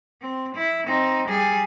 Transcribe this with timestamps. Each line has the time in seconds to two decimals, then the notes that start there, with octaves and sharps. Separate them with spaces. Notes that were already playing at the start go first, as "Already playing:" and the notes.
0.21 C4
0.55 E4
0.87 C4 D#4
1.28 G3 G#4